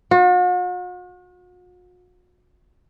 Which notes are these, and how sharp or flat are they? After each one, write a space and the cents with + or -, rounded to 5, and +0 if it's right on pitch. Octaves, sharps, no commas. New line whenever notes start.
F#4 -45